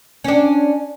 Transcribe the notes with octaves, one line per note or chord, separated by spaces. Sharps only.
C#4 D4